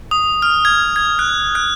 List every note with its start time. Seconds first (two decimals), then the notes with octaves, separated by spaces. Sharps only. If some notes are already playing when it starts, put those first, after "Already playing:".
0.11 D#6
0.42 F6
0.65 G#6
0.96 G#6
1.19 F#6
1.55 F#6